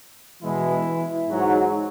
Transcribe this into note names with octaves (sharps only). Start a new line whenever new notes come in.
B2 E3 G#3 E4
G#2 F#3